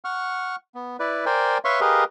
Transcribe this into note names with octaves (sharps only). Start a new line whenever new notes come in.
F#5 C#6 F6
B3
E4 B4 D5
A#4 C5 D5 G5 G#5
B4 C#5 E5 F5 C6 C#6
G4 G#4 A#4 B4 D#5 F5